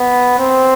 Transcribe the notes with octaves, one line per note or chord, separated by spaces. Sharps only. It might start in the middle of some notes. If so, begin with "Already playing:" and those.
Already playing: B3
C4